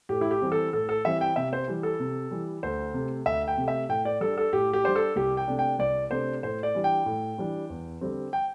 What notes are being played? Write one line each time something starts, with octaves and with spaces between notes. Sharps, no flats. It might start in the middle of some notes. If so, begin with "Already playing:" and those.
A2 G4
E4
G4
E3 G3 C4
A4
A2 A4
A4
E3 G3 C4 E5
G5
C3 E5
C5
E3 G3
A4
C3
E3 G3
D2 C5
C3 A3
D2 E5
G5
C3 A3
E5
A2 G5
D5
G3 D4 A4
A4
A2 G4
G4
G3 D4 C5
A4
C2 G4
G5
C3 A3 D4
G5
C2 D5
C3 A3 D4 C5
A2 C5
D5
E3 G3 D4
G5
A2
E3 G3 D4
E2
D3 G3 C4
G5